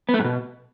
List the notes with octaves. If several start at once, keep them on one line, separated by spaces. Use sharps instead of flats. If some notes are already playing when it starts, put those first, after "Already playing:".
B3
A3
G#2
B2